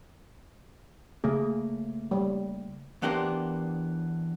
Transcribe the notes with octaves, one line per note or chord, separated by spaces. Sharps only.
C#3 A3 A#3 G#4
G3
E2 B3 D4 G4 A#4 C5